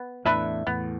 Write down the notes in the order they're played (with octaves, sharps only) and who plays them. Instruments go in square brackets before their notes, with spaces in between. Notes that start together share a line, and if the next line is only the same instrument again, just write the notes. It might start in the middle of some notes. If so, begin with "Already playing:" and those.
Already playing: [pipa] B3
[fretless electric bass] E2 A2 [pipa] D4 B4 E5
[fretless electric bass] E2 A2 [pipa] B3